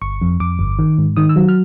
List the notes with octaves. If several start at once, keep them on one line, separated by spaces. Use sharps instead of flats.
G1 C#6
F2
F2 D6
G1
D#3
G#2
D#3 D#6
E6
F#3
F6